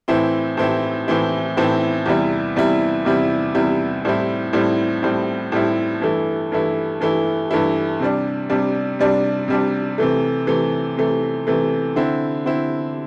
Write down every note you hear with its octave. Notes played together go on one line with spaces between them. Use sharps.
A2 E3 C4 E4
A2 E3 C4 E4
A2 E3 C4 E4
A2 E3 C4 E4
E2 C3 G3 E4
E2 C3 G3 E4
E2 C3 G3 E4
E2 C3 G3 E4
A2 G3 C4 E4
A2 G3 C4 E4
A2 G3 C4 E4
A2 G3 C4 E4
G2 E3 A3 E4
G2 E3 A3 E4
G2 E3 A3 E4
G2 E3 A3 E4
C3 G3 D4
C3 G3 D4
C3 G3 D4
C3 G3 D4
C3 E3 A3
C3 E3 A3
C3 E3 A3
C3 E3 A3
D3 C4 E4
D3 C4 E4